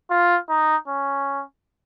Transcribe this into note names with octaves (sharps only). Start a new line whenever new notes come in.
F4
D#4
C#4